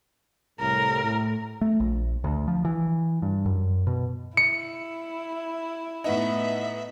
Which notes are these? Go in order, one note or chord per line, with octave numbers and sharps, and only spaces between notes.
C2 A2 A#4
A2
A3
A#1
D2
F3
E3
G2
F#2
B2
E4 C#7
A2 B3 D#4 E5